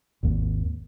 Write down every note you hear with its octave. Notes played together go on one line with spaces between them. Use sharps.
G#1 D#2